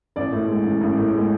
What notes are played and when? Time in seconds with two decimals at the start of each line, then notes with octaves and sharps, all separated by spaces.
0.16 A1 D5
0.32 A2
0.48 G#3
0.64 A1
0.81 A1
0.97 A2
1.14 G#3